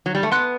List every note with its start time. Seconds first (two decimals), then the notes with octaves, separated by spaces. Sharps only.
0.06 F#3
0.15 G3
0.23 A3
0.31 B3 F#5 C6 F#6